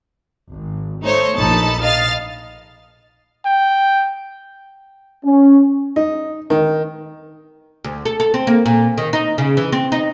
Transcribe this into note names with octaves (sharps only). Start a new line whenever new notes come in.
G#1
A3 D#4 C5 C#5
A#1 D#4 A4 A5 B5
D#5 F5 F6 A6
G5
C#4
D#4
D#3
D2
A4
A4
C4
A#3
A#2
D#3
D#4
C#3
E3
C4
D#4